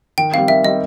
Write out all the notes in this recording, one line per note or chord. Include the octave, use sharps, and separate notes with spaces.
D#3 G5
G3 C4 F5
D#3 E5
G3 C4 D#5